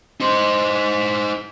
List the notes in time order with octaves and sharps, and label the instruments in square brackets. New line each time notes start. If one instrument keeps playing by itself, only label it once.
[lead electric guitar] D#4 C5